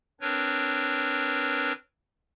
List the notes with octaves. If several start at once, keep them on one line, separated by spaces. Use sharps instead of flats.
C4 D4 A#4 B4 C#5